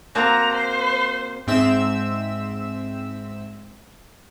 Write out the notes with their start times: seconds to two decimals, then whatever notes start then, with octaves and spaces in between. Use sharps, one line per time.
0.15 A#3 C4 F#4 A#5
0.55 C5
1.47 G#2 C4 E5 E6